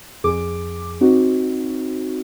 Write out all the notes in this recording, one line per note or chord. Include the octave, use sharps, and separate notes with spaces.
F2 G#4 D6
C4 D#4 F#4